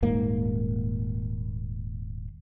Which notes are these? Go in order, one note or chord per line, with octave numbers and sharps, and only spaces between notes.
D#1 G#2 A#3